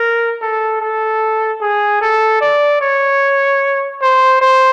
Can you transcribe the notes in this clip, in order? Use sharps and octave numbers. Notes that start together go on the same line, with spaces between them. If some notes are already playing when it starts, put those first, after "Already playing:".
Already playing: A#4
A4
A4
G#4
A4
D5
C#5
C5
C5